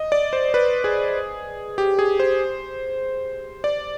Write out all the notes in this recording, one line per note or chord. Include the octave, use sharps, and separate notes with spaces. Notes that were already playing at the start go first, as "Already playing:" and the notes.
Already playing: D#5
D5
C5
B4
G#4
G4
G#4
C5
D5